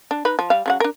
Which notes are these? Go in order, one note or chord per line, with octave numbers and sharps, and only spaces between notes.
D4
D#4 B4
F3
G3 F5
C#3 F#3 F#5
D4 A#4